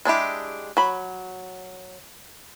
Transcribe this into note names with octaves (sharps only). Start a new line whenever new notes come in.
G#3 D4 E4 G4
F#3 B5